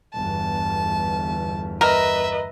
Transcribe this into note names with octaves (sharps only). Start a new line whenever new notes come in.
G1 E2 A5
A#4 B4 D#5 E5